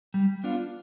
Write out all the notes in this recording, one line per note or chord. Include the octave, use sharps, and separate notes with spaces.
G3
B3 D4 F4